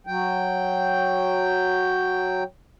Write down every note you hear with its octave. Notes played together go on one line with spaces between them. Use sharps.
F#3 G5